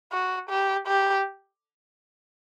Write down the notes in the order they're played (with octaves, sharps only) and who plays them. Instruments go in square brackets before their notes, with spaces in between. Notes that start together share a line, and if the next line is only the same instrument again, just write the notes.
[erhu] F#4
G4
G4